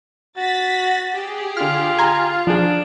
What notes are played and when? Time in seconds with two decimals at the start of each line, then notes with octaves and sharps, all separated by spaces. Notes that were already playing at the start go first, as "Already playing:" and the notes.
0.37 F#4 A6 B6
1.13 G4 G#4
1.57 D3 F4 F6
1.98 G#5 A#5 C6
2.47 F3 D4 G#4